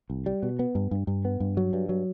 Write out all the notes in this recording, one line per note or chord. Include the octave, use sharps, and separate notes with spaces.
C2
G3
B2
B3
G2
G2
G2
B3
G2
F#3
G2
F#3